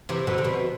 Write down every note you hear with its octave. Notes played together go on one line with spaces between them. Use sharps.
C3 E3
B2 D3
C3
B2